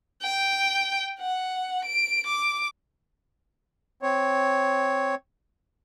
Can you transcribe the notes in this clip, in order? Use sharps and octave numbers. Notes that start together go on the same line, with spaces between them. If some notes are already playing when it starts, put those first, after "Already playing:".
G5
F#5
D7
D6
C4 C#5